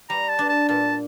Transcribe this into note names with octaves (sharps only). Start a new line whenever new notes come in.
G3 A#5
A5
D4
A5
A#2 A5